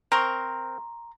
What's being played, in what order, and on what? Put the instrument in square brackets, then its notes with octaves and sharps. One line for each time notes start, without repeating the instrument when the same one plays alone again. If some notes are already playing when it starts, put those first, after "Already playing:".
[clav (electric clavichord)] C4 A#4 [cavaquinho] A#5 C6 C#6